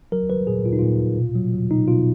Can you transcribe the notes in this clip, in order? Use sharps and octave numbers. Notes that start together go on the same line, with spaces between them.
F#3 A#4
F#3 B4
A#2 G#4
A#2 F4
D#4
A#2 F4
A#2
B2
F#3
F#3
B2 D#4
B2 F4